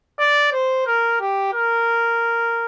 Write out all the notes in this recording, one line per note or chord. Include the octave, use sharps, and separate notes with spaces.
D5
C5
A#4
G4
A#4